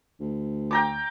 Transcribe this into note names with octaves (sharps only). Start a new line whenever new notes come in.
D2
G5 A#5 D6